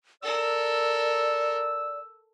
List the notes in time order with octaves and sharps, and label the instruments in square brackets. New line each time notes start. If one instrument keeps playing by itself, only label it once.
[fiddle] A4 A#4 [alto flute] D5 [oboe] E6